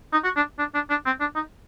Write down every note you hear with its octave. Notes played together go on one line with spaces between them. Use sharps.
D#4
F#4
D4
D4
D4
D4
C4
D4
D#4